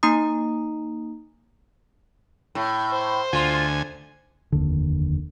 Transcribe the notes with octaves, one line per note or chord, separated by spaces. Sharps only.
A#3 D#4 A#5 D#6
A2
C5
D2 F4 G#5
F1 D#2 D3